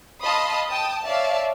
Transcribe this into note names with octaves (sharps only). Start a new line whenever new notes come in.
D#5 F5 A5 B5 C6 D#6
G5 A5 D#6
C#5 D5 E5 F5 A5